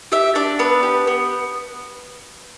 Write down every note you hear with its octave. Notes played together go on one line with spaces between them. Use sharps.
G4 E5
D4 D5
B3 B4
G4
B3